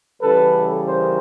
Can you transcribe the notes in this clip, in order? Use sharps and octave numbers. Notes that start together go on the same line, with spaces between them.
C#3 E3 G3 A4 B4
A#4 C5